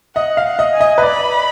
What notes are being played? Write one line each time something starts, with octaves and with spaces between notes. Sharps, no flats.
D#5 F#5
F5
F#5
D#5
G#5
D#5
B4
D5 B5